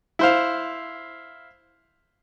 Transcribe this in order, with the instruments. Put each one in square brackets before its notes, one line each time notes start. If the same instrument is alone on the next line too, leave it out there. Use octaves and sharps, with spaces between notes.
[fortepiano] E4 C5 F5